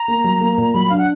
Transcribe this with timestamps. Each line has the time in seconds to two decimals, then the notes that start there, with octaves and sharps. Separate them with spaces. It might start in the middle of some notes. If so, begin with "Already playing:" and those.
Already playing: A#5
0.08 A#3
0.24 F#3
0.41 A#3
0.58 A#2
0.73 F#3 B5
0.90 D4 F5
0.98 F#5